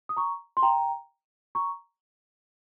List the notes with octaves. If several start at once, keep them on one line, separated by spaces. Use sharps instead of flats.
D#6
A#5 C#6
C6
G5 A#5
A#5 C#6